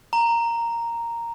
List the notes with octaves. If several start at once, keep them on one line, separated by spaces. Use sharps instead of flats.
A#5